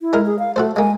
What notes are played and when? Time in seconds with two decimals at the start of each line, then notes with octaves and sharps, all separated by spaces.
0.01 E4
0.13 G#3 A#4
0.26 G#4
0.39 F5
0.56 A3 F#4 A4 C5
0.76 G#3 A#3 G#5